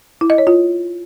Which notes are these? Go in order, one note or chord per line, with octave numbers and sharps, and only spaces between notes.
E4
D#5
C#5
F4